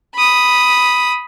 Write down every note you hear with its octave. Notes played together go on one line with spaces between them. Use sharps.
B5 D#6